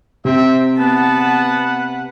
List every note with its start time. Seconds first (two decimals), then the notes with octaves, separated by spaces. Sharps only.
0.25 C3 C4 E5
0.78 B3 B4 F#5 A5